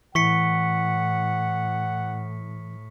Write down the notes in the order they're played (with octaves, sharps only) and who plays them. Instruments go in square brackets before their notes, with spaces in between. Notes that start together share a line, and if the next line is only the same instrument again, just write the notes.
[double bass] A2 [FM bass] E3 [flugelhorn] F#5 [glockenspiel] C#6 B6 C#7